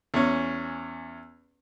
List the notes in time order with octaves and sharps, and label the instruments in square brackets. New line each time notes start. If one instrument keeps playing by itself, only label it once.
[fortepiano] E2 C#4